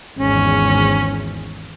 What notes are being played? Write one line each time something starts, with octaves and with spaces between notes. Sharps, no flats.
G#1 E2 C#4